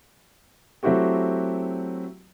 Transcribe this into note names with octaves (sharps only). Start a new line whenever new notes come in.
F#3 A3 C4 E4 F#4 G4